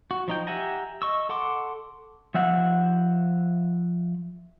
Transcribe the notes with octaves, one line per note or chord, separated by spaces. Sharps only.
F#4
F3 D#4 G5
G4 E5 F#5 G#5 A#5
D#5 C#6 E6
A4 F#5 C6 D6
F3 E5 F#5